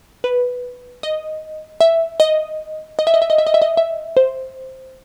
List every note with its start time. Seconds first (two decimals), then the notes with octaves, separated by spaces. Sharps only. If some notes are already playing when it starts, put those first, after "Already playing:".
0.24 B4
1.03 D#5
1.81 E5
2.20 D#5
2.99 D#5
3.07 E5
3.14 D#5
3.22 E5
3.30 D#5
3.38 E5
3.47 D#5
3.54 E5
3.62 D#5
3.77 E5
4.17 C5